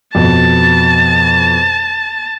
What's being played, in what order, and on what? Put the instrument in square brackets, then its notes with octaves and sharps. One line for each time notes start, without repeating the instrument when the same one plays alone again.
[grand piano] F2 B2 [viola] A5